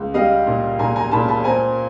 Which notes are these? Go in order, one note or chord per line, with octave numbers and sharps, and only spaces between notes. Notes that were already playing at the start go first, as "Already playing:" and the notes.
Already playing: C#2
G3 D#5 F5
A#2
A#2 G#5 A#5
G#5 A#5
A#2 A5 B5
A5 B5
C4 G#5 A#5